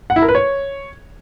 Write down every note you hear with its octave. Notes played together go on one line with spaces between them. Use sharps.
F#5
E4
A#4
B4
C#5